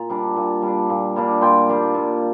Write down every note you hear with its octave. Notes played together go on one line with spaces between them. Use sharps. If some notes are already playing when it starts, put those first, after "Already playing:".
Already playing: A#2 A#5
G3 D4
A#2
G3 D4
A#2
G3 A#3 D4
A#2 G5 C6
G3 A#3 D4
A#2